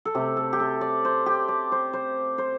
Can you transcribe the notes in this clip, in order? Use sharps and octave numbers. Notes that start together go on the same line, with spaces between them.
A4
C3 A3 G4
A4
G4
A4
D5
C5
G4
D5
C5
C5
C5